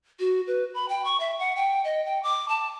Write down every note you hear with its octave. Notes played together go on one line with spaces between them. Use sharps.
F#4
B4
B5
G5
C#6
E5
F#5
G5
D#5
G5
D6
A5